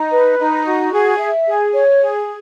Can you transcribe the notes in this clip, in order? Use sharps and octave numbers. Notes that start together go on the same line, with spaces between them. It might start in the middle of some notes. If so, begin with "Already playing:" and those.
Already playing: D#4
B4
D#4
F#4
G#4
E5
G#4
C#5
G#4